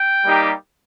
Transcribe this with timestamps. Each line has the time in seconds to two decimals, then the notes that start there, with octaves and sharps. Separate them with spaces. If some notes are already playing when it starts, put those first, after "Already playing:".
Already playing: G5
0.25 G3 A#3 D#4 G4